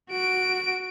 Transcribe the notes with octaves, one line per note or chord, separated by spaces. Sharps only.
F#4 D7